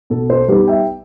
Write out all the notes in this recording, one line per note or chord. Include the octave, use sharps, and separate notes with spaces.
B2 A4
A4 C5
G3 B3 D#4 G4 B4
E5 G5